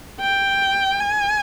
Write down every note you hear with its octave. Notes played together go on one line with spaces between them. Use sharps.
G5
G#5